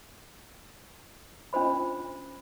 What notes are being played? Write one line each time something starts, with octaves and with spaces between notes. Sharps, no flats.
C#4 D4 F4 C5 B5